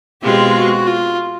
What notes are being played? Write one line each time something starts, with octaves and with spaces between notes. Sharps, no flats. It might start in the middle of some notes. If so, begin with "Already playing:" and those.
B2 G#3 C4 F4 G4
F#4
F4